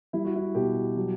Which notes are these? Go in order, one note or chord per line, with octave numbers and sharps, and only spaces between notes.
G3 E4
F#4
E4
B2 G4
F#3